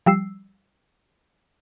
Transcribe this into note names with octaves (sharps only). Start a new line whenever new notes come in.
F3 G3 E6 C7